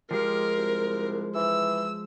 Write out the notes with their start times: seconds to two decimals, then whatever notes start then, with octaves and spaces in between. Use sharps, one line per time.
0.11 F3 G#3 G4 A#4 F5
0.57 C2
1.35 E3 E6